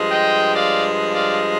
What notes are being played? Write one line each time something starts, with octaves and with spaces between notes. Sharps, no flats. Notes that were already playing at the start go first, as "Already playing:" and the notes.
Already playing: G2 F3 G#3
D#5 G5
D5 F5
D5 F5